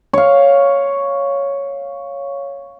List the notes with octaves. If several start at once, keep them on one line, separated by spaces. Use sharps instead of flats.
C#5 F5